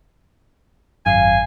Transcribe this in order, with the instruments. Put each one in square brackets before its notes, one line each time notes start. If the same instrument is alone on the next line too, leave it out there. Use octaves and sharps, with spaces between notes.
[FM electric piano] G#1 F#2 [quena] F5 [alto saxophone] G#5